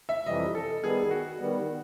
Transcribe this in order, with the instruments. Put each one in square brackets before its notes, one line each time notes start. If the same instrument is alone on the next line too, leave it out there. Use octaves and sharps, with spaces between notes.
[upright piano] E5
[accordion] F2 C3 E3 G3 [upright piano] D#5
[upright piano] A4
[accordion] D#3 G3 B3 [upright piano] G#4
[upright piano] F#4
[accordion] D#3 G3 B3